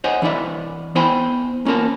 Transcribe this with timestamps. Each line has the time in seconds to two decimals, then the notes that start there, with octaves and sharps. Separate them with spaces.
0.04 C5 C#5 D#5 F#5 G#5
0.22 E3 D4 E4 D5 E5
0.95 B3 E4 C5 G5 G#5 B5
1.65 A#3 C#4 F4 A#4 A5